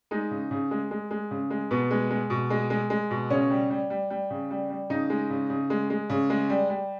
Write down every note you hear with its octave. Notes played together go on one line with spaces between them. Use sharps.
G#3 D#4
C#3
C#3
G#3
G#3
G#3
C#3
G#3
B2 B3
G#3
G#3
B2
G#3
G#3
G#3
B2
C#3 C#4
G3
G3
G3
G3
C#3
G3
G3
C#3 D#4
G#3
C#3
C#3
G#3
G#3
C#3
G#3
G3
G3